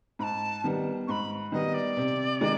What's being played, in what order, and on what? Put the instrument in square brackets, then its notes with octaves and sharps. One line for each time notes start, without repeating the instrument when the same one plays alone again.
[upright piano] G#2 [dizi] B5
[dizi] A5
[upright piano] D#3 G3 B3
[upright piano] G#2 [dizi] B5 C#6
[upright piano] D#3 G3 B3 [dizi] D#5
[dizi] D5
[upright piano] C3
D#3 G#3